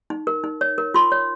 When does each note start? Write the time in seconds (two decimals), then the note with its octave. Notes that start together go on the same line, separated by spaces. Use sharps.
0.10 D#4
0.27 A#4
0.44 D#4
0.61 C#5
0.78 A#4
0.94 F4 C6
1.12 C#5